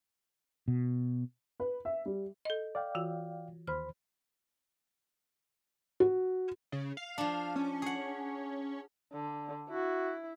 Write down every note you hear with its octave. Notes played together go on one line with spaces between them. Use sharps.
B2
B4
E5
G3
A4 D#5
D5 F5 G5
E3 F4 F#4
D#2 C5 B5 F6
F#4
C#3
F5
F3 D4
C#4
G#4 F#5
D3
E4 F#4